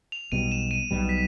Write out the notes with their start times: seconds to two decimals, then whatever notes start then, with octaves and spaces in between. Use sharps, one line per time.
0.12 F7
0.32 B1 B2 G3 D#7
0.52 E7
0.71 D#7
0.91 B1 B2 G3
1.09 B6